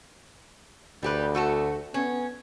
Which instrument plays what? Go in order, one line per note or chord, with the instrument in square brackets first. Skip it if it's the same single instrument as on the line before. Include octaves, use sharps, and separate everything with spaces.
[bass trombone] D2 [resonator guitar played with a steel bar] G3 G4 B4
[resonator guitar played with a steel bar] A3 F#4 A4
[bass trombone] B3 [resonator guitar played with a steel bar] C#4